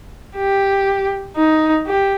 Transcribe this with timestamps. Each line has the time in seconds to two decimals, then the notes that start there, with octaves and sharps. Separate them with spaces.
0.36 G4
1.36 D#4
1.87 G4